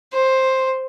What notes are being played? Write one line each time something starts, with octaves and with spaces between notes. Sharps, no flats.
C5